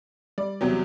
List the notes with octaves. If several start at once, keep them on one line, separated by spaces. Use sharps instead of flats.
G3 D5
E2 C3 F#3